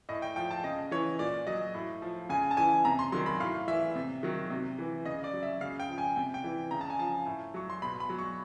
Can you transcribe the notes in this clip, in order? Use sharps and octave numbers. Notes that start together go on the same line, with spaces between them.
A2 D#5
G5
F3 G5
A5
C#3 D#5
E3 C#5
A#2 D5
F#3 D#5
A2
F3
C#3 G#5
A5
E3 G#5
C3 A#5
C6
D#3 F#3 C6
B5
A2 F5
E3 E5
C3
D#3 F#3
C3
E3
C#3 D#5
D5
F#3
E5
C#3 F5
G5
F3
G#5
C3 G5
G5
E3
C#3 A#5
A5
G#5
F3 A5
A2
F#3 C#6
C6
B2 B5
B5
F#3
C#6